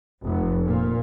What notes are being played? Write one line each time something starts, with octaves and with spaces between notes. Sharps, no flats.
F1
A#2